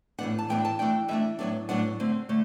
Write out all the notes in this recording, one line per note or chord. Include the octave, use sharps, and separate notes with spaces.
A2 E3 B3 D4 F#5
A5
A2 E3 B3 D4 G5
A5
E3 A3 D4 G5
E3 A3 D4 E5
A2 F#3 B3 D4
A2 F#3 B3 D4 F#5
D3 A3 C4
D3 A3